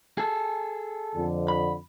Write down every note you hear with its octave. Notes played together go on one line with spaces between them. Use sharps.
G#4 A4
F2 D3
B5